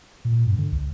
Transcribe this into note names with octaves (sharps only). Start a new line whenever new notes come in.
A#2
G2
D3
C#2